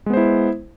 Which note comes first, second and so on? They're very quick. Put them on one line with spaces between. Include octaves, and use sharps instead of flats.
G#3 B3 C5 E4